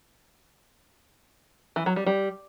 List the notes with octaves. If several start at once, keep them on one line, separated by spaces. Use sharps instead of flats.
E3
F#3
G3
G3